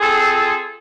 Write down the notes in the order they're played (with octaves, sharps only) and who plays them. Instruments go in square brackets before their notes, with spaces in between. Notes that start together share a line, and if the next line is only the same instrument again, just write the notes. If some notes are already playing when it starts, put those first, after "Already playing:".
[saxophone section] C4 F4 G#4 A4